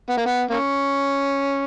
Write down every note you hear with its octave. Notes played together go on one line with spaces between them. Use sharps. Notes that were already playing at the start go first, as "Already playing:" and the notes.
B3
A#3
B3
A#3 C#4